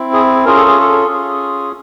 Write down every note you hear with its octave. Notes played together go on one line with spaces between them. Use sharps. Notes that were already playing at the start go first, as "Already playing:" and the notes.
Already playing: C4 E4
G#4
C#4 F4 G#4 A#4
A4
G#4
A4
C#4 F4 G#4